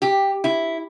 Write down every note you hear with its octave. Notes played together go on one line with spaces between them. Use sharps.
G4
E4